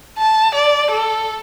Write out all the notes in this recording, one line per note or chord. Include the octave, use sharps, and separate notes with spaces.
A5
D5
A4